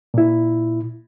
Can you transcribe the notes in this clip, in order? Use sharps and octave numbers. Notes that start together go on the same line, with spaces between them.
A#2 E4